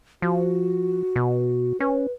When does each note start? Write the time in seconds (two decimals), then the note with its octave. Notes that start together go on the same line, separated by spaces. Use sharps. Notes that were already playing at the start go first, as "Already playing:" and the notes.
0.22 F3 F#4
1.16 B2
1.80 C#4 B4